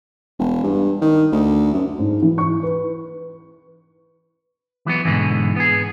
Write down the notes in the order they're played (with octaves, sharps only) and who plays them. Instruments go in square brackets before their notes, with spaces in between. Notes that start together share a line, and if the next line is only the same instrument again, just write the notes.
[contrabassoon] E1
G2
D#3
D2
F#2
[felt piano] G#2
E3
C#6
B4
[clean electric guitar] E3 F#3 B3
G#2 B2 D3 E3
B3 G#4